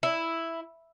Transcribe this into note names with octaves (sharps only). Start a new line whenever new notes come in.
E4